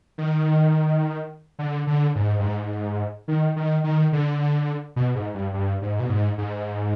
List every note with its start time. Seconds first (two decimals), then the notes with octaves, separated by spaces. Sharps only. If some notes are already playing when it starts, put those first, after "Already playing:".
0.18 D#3
1.59 D3
1.87 D3
2.15 G#2
2.39 G2
2.43 G#2
3.28 D#3
3.56 D#3
3.84 D#3
4.13 D3
4.96 B2
5.15 G#2
5.34 G2
5.54 G2
5.82 G#2
6.00 B2
6.09 G#2
6.38 G#2